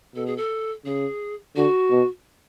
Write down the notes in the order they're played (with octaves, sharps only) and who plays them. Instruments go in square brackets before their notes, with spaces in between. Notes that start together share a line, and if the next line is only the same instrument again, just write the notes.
[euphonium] B2 [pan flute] A4
[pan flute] G#4
A4
[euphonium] C#3 [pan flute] G#4
[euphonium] D3 [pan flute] F#4
[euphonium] B2